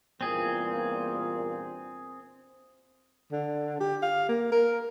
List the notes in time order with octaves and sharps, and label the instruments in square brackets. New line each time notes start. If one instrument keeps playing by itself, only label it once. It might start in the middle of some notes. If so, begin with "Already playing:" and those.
[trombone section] E2 G2 A#2 [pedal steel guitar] C4 G#4
[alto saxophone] D3
G4
F5
A#3
A#4